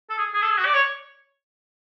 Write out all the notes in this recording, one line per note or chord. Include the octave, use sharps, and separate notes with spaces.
A4
G#4
G#4
A4
G#4
F#4
D5
C#5